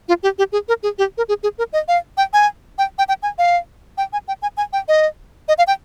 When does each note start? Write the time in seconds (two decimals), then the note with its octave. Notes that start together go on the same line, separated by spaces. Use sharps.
0.08 F4
0.23 G4
0.38 G4
0.52 G#4
0.68 A#4
0.83 G#4
0.98 G4
1.18 A#4
1.29 G#4
1.43 G#4
1.58 A#4
1.73 D#5
1.88 F5
2.17 G5
2.33 G#5
2.78 G5
2.98 G5
3.09 G5
3.23 G#5
3.38 F5
3.98 G5
4.13 G#5
4.28 G5
4.42 G#5
4.57 G#5
4.73 G5
4.88 D#5
5.48 D#5
5.58 F5
5.67 G5